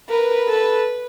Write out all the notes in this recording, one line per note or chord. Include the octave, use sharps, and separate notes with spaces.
A#4 B4
A4